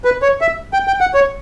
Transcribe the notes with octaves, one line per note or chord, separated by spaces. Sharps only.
B4
C#5
E5
G5
G5
F#5
C#5